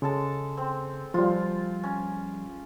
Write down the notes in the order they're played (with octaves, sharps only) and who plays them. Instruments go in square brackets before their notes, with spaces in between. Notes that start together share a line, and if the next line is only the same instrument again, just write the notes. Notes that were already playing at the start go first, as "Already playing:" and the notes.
[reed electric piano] C#3 [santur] G#3 A4 A5
[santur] C4
[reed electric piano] F3 G3 [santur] F4
[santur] C#4